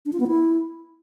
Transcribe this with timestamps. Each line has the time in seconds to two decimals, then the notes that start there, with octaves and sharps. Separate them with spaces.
0.05 D4
0.13 F4
0.20 B3
0.27 E4